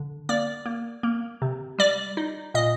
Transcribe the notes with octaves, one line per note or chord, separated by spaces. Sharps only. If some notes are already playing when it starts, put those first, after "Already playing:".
Already playing: D3
A#3 D5
A#3
A#3
C3
G3 D5
D#4
A#2 D#5